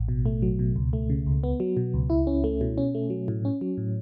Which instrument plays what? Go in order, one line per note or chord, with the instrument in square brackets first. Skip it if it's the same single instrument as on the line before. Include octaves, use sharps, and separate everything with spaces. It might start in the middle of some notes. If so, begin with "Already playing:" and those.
Already playing: [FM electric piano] A1
B2
A3
F#3
B2
C#2
A3
C#3
C#2
B3
F#3
B2
C#2
E4
C#4
A3
B2
C#4
A3
F#3
A2
C#4
F#3
A2